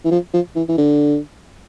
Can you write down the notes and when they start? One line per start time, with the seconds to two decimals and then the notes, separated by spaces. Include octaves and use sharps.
0.05 E3
0.12 F3
0.34 F3
0.56 E3
0.69 E3
0.78 D3